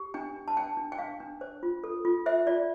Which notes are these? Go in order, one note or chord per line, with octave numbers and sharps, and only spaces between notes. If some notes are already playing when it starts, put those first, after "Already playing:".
Already playing: G4
D4 G5
D4
A5
D4 G5
D4
G5
D4 F5
D4
C5
F4
A4
F4
C5 E5
F4 D5